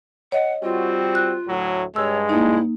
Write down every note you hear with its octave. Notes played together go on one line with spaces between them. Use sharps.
C#5 D#5 F#5
G3 C4 F4 F#4
F#6
D2 A2 F#3
G2 G#3 C#5 E6
A#3 D#4 E4